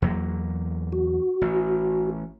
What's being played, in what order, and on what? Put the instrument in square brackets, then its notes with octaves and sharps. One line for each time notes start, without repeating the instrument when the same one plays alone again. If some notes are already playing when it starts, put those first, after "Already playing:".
[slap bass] E2 F#3 A#3
[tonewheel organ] F#4
[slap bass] A1